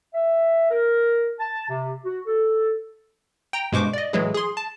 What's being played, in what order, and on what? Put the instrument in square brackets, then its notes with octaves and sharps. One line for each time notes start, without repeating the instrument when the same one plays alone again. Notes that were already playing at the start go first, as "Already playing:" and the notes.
[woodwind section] E5
A#4
A5
C3
F#4
A4
[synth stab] G5 A#5
G2 B2 G#3 C5 C#6 D6
D5 D#5
A2 E3 F#3 G#3 E4 G#4
G#4 C6
A5